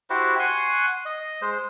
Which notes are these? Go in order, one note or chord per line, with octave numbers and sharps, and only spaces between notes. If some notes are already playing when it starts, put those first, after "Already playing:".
E4 F#4 G4 C5
F#5 G#5 C6 C#6
D#5
G#3 C5